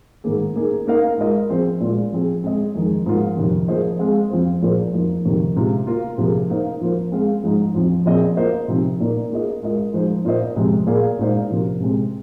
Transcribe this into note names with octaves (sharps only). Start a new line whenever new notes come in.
G#2 D#3 A#3 G#4
A#3 D#4 G#4
A#3 D#4 A#4 F5
G#3 F4 A#4 D#5
F3 C4 G#4 C5
A#2 G#3 F4
F3 C4 G#4
G#3 C4 G#4 D#5
F2 D#3 G#3 D#4 G#4
G#2 F3 A#3 F4
F2 C3 D#3
F3 A#3 G#4 C5 D#5
G#3 C4 G#4 F5
F2 F3 C4 F4 C5
A#2 F3 A#3 G#4 C5
F2 F3 A#3 D#4
F2 C3 D#3 A#3
C3 G#3 F4
A#3 F4 A#4
C3 F3 A#3 G#4
A#3 D#4 C5 F5
F3 A#3 F4 C5
G#3 C4 G#4 F5
G#2 F3 G#3 D#4
F2 F3 C4
A#2 F3 C4 G#4 D#5
A#3 F4 C5 D#5
C3 F3 C4 D#4
A#2 A#3 D#4 A#4
A#3 F4 G#4 D#5
G#3 F4 A#4 D#5
F3 G#3 D#4 C5
A#2 A#3 F4 C5 D#5
F2 C3 G#3 C4
A#2 A#3 G#4 F5
A#2 G#3 D#4 C5 F5
C3 F3 A#3
C3 G#3 C4